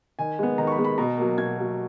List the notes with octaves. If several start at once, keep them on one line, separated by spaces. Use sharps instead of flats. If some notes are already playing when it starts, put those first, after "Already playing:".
D#3 G#5
G#3 B3
D#3 A#5
C#6
B5
G#3 B3
B5
B2 A#5
F#3 A#3
B2 G#6
F#3 A#3